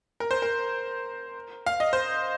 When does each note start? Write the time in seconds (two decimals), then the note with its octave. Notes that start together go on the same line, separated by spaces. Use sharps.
0.20 A#4
0.31 C5
0.42 A#4
1.66 F5
1.80 D#5
1.93 C5